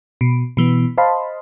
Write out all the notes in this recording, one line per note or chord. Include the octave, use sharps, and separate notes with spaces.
B2
B2 E3 B3
C5 D#5 F5 A5 B5 C6